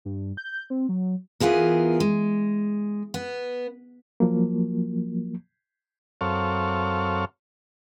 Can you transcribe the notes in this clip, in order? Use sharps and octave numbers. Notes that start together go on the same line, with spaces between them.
G2
G6
C4
F#3
E3 B3 F4 G#4 A#4
G#3
B3
F3 F#3 A#3
F#2 C4 A4 C#5 F5